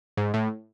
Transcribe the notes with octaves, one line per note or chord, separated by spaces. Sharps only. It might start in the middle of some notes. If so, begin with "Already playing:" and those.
G#2
A2